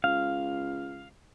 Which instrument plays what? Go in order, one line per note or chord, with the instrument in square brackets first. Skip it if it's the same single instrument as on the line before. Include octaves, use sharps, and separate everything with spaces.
[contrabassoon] C#2 [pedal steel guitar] F5